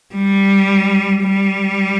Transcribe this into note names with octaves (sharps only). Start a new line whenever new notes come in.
G3
G3